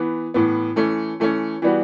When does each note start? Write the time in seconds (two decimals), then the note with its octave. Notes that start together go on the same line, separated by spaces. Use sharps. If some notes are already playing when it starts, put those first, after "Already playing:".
Already playing: E3 B3
0.34 A2 E3 B3
0.76 E3 A3 C#4
1.20 E3 A3 C#4
1.62 E3 G3 B3 F#4